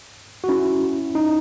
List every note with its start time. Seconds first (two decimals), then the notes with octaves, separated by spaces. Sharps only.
0.44 F#4
0.49 C#4 E4
1.15 D#4